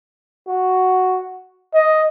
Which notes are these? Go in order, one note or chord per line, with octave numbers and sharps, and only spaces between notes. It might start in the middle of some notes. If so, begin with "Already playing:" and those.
F#4
D#5